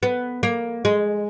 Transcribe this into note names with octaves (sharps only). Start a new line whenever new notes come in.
B3
A#3
G#3